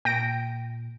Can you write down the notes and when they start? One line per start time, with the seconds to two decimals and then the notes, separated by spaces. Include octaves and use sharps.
0.05 A#2 G5 A#6 D7